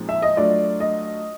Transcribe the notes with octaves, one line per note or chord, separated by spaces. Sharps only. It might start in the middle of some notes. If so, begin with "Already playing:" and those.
Already playing: A#2 F3 G#3 C4 D#4
E5
D#5
F#3 A3 D4 F4 D5
D#5